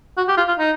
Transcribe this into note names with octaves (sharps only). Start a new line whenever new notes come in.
F#4
G4
F4
F4
D#4